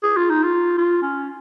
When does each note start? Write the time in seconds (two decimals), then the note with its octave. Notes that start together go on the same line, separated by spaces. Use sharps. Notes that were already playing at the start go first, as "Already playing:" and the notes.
0.03 G#4
0.17 F4
0.30 D#4
0.43 F4
0.78 F4
1.02 C#4